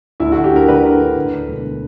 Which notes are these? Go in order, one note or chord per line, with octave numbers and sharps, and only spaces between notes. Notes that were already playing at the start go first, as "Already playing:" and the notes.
D2 E4
D2 F#4
G4
D3 A#4
D3 B4
D3
D3
D2
D2
E1